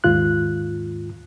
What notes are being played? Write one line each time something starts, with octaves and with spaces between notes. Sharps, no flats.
D#2 G#2 F4 F#6